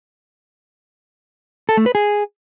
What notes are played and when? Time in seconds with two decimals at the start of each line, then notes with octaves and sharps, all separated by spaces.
1.69 A4
1.77 A3
1.86 B4
1.95 G#4